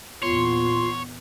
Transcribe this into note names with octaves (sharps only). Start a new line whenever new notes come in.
E2 A#2 B3 F4 C#5 C6